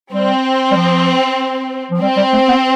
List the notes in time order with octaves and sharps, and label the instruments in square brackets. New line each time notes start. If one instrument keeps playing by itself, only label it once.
[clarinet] G3 [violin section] C4
[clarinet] G3
F3
F3
[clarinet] G3 [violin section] C4
[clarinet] G3
A3
B3